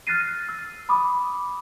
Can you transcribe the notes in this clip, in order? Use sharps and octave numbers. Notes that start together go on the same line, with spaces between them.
F6 F#6 A6 A#6 C7 D#7
E6
B5 D6 D#6